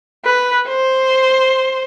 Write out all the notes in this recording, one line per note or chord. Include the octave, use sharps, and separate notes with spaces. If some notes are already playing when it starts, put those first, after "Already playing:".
B4
C5